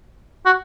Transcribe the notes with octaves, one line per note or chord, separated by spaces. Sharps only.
F#4